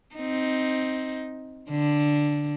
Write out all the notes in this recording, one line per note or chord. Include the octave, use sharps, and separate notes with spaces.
C4 D#4
D3